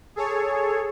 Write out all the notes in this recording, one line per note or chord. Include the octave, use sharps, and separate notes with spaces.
G#4 A4 C#5